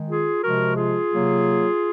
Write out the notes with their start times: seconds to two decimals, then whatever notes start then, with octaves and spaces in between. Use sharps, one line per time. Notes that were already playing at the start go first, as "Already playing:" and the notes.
Already playing: D#3 G#3
0.09 F4 G#4
0.43 C3 F3 G#3 F#4 A#4
0.76 F4 G#4
1.11 C3 F#3 A#3